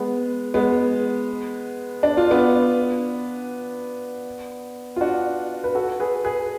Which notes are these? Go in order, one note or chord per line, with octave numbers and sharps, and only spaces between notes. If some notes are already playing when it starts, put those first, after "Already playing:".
Already playing: G#3 B3
G#3 B3
D4
F4
B3 D4
F4
D4 F#4
B4
F#4 A4
G#4 B4
G#4 B4